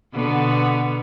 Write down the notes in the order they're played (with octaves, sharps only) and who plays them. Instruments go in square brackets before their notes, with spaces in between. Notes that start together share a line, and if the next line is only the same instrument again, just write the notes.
[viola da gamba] B2 D3 B3